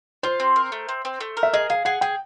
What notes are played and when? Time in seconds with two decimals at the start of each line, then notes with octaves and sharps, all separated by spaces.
0.23 F4 C5
0.40 C4
0.56 A#4
0.72 A3
0.89 C4
1.05 C4
1.20 A3
1.37 A#4
1.43 E5
1.53 G#4 D#5
1.70 G#4 F5
1.85 G#4 F#5
2.01 G#4 G5